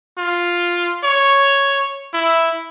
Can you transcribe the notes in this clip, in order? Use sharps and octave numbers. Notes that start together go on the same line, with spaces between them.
F4
C#5
E4